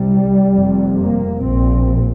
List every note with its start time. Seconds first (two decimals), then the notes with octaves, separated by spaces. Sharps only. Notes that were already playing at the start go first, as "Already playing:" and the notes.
Already playing: C2 C3 G3
0.54 F1 F2 C3
0.98 A#3
1.41 A#1 A#2 C4